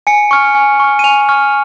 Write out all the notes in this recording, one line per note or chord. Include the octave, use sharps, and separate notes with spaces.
G#5 C#7
C#6 F6
G#5
C#6 F6
D#7
G#5 F7
C#6 F6